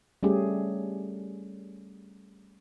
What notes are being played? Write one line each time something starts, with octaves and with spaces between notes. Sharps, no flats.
G3 A3 C#4 G4 G#4